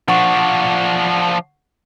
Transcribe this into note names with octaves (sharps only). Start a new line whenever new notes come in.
F3 D4 F#5 C#6